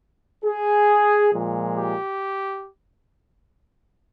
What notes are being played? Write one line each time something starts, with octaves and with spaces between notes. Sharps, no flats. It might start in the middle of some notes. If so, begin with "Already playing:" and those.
G#4
A#2 F3 G#3
G4